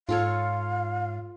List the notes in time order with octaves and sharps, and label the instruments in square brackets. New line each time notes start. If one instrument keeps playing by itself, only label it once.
[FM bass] G#2 [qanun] F4 A4 C#5 [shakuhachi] F5